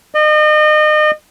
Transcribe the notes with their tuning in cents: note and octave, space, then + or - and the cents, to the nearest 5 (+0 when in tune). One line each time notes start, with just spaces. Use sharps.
D#5 -35